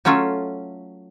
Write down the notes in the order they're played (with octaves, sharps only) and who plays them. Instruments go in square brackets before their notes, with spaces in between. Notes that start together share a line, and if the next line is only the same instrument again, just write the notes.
[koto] F#3 A3 C#4 F4 A4